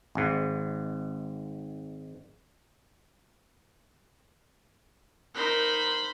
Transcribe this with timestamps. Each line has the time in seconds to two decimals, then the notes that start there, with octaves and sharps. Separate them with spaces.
0.15 G#1 G#2
5.35 D#4 A#4 C5 B5